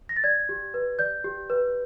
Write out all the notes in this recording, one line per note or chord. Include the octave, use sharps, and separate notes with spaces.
A#6
A6
D5 G#6
G4
B4
D5 G6
G4
B4